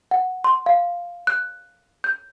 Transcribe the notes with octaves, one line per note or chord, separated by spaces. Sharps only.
F#5
C6
F5
F#6
G6